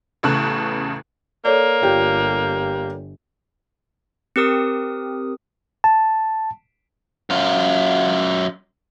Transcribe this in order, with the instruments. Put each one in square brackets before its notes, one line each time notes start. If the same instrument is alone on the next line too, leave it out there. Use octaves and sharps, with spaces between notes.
[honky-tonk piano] A1 E2 C#3 A4 C#6 F#6
[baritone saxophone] A#3 [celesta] A4 C#5 D5
[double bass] G1 [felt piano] F4 G4 G5
[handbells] C4 G4 A#4 D#6
[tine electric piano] A5
[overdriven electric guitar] F#2 F4